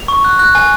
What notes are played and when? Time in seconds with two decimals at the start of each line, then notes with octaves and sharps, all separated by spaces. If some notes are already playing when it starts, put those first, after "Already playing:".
Already playing: F7
0.08 C#6
0.24 F#6
0.39 F#6
0.55 G#5